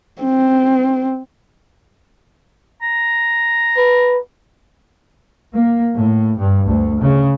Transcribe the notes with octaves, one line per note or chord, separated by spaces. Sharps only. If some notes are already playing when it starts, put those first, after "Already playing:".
C4
A#5
B4
A#3
A2
G2
D2
C#3